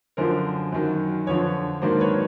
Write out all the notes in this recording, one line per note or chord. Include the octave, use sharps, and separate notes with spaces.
F#2 D3 F3 A#4 C5
F#2 D#3 F#3
F2 D3 F3 B4 C#5
G#2 D#3 F#3 A#3 D4 C5 D5
B4 C#5